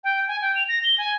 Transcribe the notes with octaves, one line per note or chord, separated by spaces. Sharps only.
G5
G#5
G5
F7
A#6
G7
G#5